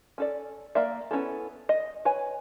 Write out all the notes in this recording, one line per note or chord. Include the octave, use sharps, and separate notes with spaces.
C#4 A4 D5
A#3 D5 E5
B3 C#4 E4 A4
D#5
B4 C#5 G#5